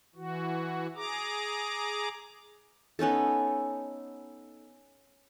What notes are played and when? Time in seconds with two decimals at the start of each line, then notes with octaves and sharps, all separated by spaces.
0.16 E3 F#4
0.96 G#4 A#5 D6
2.99 B3 C#4 D#4 A4